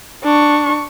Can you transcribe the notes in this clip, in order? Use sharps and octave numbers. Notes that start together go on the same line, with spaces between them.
D4 C#6